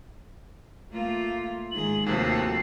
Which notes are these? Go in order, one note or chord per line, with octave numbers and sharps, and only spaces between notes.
A3 A#3 F4
G#2 D#3 G#4 F#7
D#2 C3 F3 A3 F#4 A4 C7